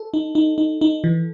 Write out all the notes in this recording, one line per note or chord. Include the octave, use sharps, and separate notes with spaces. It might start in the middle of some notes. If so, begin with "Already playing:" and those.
Already playing: A4
D#4
D#4
D#4
D#4
E3